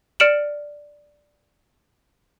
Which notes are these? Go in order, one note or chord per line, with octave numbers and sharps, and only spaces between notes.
D5 F6 C#7 D7 E7 F#7